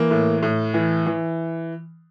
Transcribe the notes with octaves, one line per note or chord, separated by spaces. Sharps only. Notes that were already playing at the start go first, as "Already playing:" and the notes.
Already playing: E3 A#3
A2
A2
E3
E3